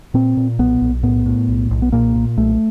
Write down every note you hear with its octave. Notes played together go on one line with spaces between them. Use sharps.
A#2 C4
A#2
B1 B3
B1
A2 B3
A2
B1
B1
B3
A#2 A#3
A#2
B1 A3